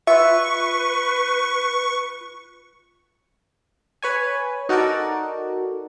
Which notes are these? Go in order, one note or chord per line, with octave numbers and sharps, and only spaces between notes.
F4 B4 E5 C#6
B4 C#5 G#5
D#4 F#4 A4 A#4 D5